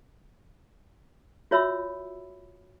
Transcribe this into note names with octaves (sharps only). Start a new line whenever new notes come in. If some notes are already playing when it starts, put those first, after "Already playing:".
F4 F#4 C#5 E5 B5 E6